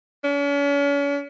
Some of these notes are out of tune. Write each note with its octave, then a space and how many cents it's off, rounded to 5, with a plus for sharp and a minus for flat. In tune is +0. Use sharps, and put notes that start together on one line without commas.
C#4 +40